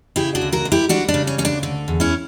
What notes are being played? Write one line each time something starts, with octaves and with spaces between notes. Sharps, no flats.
C#3 E4 G4
D4 F#4
D2
F#4 A#4
D2
E4 G4
G3 D4 F#4
D4
C#3
C#4
D2 C#4
D4
D3
E2
C#4 E4